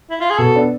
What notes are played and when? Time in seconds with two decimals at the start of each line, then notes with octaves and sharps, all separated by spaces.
0.10 E4
0.20 F4
0.30 G#4
0.38 B2 A4
0.55 B3 D4